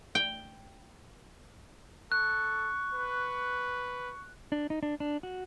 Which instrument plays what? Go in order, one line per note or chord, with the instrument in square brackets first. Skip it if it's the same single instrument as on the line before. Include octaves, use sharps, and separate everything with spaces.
[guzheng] G5
[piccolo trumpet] A4 [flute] C#6 [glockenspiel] F#6
[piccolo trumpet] B4
[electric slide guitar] D4
D#4
D4
D4
F#4